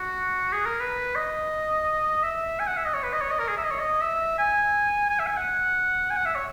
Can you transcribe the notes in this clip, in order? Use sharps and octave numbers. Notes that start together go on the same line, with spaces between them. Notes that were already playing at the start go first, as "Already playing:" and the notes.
Already playing: F#4
G#4
A#4
B4
D#5
E5
G#5
F#5
E5
D#5
C#5
B4
D#5
C#5
D#5
A#4
G#4
E5
D#5
C#5
D#5
E5
G#5
G#5
E5
G#5
F#5
G#5
F#5
E5
C#5